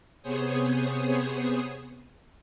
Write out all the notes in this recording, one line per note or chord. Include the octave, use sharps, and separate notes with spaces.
C3 B3 G#4 C5 C#5 D#6